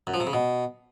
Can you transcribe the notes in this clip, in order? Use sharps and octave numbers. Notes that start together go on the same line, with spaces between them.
F#2
F3
C3
C#3
B2